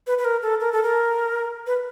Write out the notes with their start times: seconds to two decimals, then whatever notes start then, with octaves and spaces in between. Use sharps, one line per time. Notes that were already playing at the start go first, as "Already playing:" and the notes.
0.07 B4
0.18 B4
0.25 A#4
0.42 A4
0.60 A#4
0.72 A4
0.83 A#4
1.67 B4